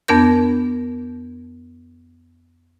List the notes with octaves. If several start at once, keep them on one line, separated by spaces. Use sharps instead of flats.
F2 B3 D4 A#4 G6